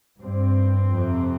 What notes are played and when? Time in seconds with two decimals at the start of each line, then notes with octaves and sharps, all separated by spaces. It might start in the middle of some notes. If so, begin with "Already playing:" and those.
0.20 G2 C4
0.92 F2 C3